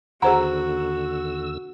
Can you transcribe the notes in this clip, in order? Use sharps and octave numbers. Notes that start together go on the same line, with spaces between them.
D#2 D3 F#4 G#4 C5 F#5 A#5 E6